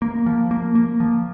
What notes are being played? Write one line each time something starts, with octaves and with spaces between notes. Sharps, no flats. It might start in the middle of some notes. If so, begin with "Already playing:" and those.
A#3
F3
A#3
A#3
F3